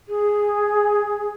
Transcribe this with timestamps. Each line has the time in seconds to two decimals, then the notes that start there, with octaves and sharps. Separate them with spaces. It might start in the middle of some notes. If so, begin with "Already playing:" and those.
0.08 G#4